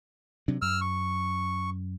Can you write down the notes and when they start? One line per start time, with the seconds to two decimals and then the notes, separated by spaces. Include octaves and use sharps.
0.48 C3 F#3 D4
0.62 F#2 E6 F6
0.81 C#6